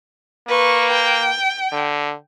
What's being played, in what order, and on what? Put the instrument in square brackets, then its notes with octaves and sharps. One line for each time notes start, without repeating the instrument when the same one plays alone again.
[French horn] A#3 [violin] B4 C#6
[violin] G5
[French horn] D3